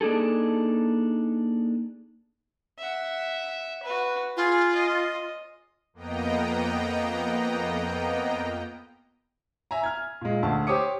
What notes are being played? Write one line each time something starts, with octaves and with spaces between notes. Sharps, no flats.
A#3 D4 D#4 G#4 A4
E5 F#5
F#4 B4
F4 G#4
D#5
F2 A#3 B3 D#5 G5 A#5
E5 G#5 A#5
F6 G#6
A#2 G#3
D2 A5
G4 C5 C#5 D6 D#6 C#7